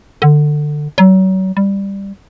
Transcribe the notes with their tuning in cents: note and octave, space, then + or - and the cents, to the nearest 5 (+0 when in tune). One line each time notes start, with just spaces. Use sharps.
D3 +20
F#3 +35
G3 +10